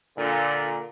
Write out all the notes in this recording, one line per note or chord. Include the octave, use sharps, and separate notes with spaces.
A#2 D3